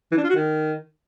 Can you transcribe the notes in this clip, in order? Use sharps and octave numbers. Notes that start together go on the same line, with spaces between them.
E3
D4
F4
F#4
D#3